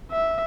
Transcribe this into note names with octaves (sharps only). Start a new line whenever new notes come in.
E5